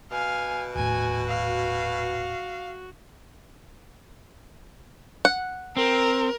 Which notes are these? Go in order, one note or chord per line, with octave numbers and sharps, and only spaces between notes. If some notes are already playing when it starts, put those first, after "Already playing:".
B2 F5 G#5
D#1 A2 F#4 G#5
F5
F#5
C4 A#4